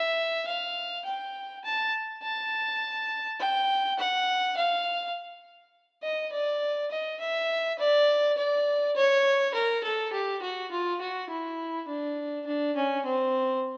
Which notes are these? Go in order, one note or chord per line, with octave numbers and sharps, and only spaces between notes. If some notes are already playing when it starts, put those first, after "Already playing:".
Already playing: E5
F5
G5
A5
A5
G5
F#5
F5
D#5
D5
D#5
E5
D5
D5
C#5
A#4
A4
G4
F#4
F4
F#4
E4
D4
D4
C#4
C4